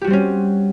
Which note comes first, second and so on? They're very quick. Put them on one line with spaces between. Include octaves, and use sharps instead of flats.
G4 F#4 G3 C4 C#4